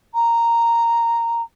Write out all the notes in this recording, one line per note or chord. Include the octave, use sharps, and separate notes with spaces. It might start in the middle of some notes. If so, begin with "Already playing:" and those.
A#5